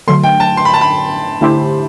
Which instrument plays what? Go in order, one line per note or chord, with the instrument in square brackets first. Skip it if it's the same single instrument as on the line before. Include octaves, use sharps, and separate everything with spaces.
[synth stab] D3 F#3 A3 [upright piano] C6
[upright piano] G5
A5
C6
B5
A5
B5
[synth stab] D3 A3 E4 G4 C5